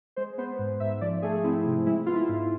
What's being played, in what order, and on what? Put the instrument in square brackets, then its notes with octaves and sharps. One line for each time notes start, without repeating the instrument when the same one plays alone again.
[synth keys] G#3 C5
B3 C5
G#2
G#2 E5
F3 D5
A3 G#4
C4 E4
C3
G#3 E4
B3 F4
E4
G#2